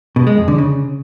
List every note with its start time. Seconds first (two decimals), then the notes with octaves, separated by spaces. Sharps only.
0.16 B2
0.27 G#3
0.37 F2
0.48 D3
0.58 C#3